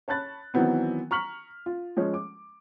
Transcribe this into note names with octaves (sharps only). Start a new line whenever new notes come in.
C#5 A5 B5 F#6 A6
D#3 E3 F#3 B3 C4
A#5 C#6 F6 B6 F#7
F4
F3 G#3 C#4
D6